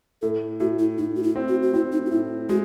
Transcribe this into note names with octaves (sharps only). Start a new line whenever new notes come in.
A2 A4
A2 F#4
E4
A2 D#4
F#4
E4
C4
F#4
F#4
C4 E4
D#4
F#4
A2 E4
G#3 F#4